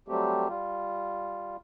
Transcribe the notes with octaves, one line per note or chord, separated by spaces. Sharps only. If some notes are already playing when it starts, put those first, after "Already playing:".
F#3 G3 A3 C4 G4
G3 F4